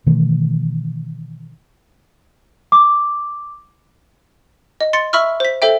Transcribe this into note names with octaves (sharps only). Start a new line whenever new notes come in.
B2 D#3 E3 A3
D6
D#5
C6 A6 C#7
E5 B5 C#6 E6 F6
C5 B6
A4 C5 E5 G5